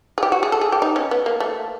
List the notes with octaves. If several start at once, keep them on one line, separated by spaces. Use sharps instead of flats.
G#4
G4
F#4
G#4
A4
G#4
G4
D#4
C#4
B3
A#3
A3